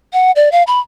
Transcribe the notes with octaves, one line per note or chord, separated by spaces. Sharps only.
F#5
D5
F5
B5